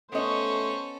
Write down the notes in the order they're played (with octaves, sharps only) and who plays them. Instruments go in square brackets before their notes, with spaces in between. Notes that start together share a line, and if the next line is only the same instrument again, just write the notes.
[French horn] A3 [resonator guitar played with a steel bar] B3 D#5 [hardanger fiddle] C#4 A4 [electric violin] C5 C#6